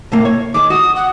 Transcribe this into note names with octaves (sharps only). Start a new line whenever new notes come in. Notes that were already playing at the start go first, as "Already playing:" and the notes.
A2 C3 A#3
C#5
D#3 G#3 D6
F#4 D#6
F#5